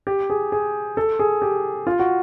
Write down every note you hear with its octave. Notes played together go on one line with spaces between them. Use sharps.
G4
G#4
G#4
A4
G#4
G4
F4
F#4